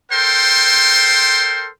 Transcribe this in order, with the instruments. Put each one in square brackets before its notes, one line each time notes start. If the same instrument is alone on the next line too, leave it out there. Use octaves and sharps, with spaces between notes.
[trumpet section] A4 A#4 C5 G5 C6